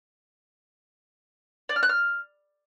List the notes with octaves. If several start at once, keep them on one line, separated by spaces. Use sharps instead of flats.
D5
F6
F#6
F6